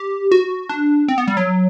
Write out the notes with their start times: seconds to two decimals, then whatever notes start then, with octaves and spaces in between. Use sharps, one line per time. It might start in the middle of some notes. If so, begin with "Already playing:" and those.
Already playing: G4
0.32 F#4
0.69 D4
1.08 C4
1.18 B3
1.27 G3
1.37 F#3